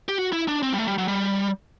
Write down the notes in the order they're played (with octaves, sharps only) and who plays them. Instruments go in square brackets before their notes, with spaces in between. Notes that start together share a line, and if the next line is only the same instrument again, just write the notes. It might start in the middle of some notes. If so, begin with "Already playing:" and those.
[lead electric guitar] G4
F#4
E4
D4
C4
G3
A3
G3
F#3
G3